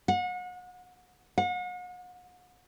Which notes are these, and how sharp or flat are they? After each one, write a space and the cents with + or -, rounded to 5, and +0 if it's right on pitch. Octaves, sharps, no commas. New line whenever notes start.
F#5 -35
F#5 -40